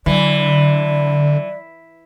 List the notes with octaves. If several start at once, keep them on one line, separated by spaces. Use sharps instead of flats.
D3 E3 F#3 D5